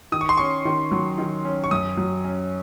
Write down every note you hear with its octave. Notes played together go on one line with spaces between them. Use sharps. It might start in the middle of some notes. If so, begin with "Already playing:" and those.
D#3 D#6
C#6
C6
C#4 C#6
D#3
F#3
D#3
C#4
C#6
F#2 D#6
F#3
C#4